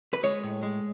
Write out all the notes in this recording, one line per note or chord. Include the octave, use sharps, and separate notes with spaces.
B4
G#3 C#5
A2
G#3